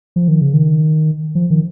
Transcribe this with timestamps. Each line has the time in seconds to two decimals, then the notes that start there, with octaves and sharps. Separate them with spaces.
0.16 F3
0.28 D#3
0.41 C#3
0.54 D#3
1.35 F3
1.50 D#3